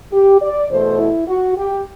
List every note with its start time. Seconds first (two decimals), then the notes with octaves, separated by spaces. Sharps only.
0.12 G4
0.40 D5
0.69 E2 B2 A3 C5
0.98 E4
1.27 F#4
1.55 G4